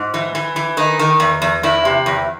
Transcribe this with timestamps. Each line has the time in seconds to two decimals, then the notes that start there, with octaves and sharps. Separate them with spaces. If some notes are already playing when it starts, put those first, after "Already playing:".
Already playing: G#2
0.14 E3
0.35 E3
0.56 E3
0.77 D#3 D#4
0.99 D#3
1.20 E2
1.42 E2
1.63 E2 E4
1.85 C3
2.06 E2